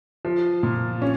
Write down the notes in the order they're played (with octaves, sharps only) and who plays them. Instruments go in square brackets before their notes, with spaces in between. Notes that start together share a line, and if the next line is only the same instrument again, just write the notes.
[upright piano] F3
A#2
C#4